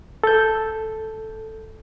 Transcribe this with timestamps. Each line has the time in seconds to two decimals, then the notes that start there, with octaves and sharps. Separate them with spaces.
0.24 A4 G6